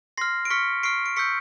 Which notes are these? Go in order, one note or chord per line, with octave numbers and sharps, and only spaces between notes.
C6 F6 A#6 C7
D7
C#6 F6 B6 C#7
C#6 F6 C7 D7
D7
C#6 E6 G6 B6 C#7